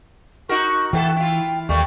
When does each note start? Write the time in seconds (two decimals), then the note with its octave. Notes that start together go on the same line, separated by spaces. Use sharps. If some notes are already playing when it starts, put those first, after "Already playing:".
0.49 D#4 F#4 A#4 C#6
0.93 E3 A3 B3 A4 G5
1.16 E4 F4
1.69 D#2 G3 A3 A#3 C#6